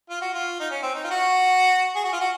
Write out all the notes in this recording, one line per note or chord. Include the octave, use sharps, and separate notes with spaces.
F4
F#4
F4
D#4
C#4
C4
D#4
F4
F#4
G#4
F#4
F4
F#4